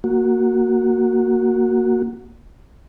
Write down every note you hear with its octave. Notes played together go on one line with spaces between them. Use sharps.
A#3 F#4